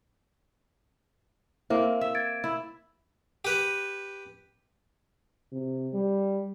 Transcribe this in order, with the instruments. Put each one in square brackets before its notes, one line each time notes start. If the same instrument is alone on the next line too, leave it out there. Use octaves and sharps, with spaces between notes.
[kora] A#3 C4 [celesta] E4 C5 E5
[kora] E5
[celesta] G#6 A6 D7
[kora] E4
[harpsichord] G4 B4
[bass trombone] C3
G3